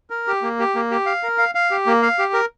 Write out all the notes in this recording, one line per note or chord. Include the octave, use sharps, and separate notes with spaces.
A#4
G4
A#3
G4
A#3
G4
F5
A#4
F5
F5
G4
A#3
F5
G4
A#4